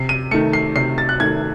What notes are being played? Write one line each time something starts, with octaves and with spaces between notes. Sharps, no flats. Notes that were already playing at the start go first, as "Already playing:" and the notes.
Already playing: C3 C7
D#7
D#3 A3 C#7
C7
C3 C7
A6
F#6
D#3 A3 G#6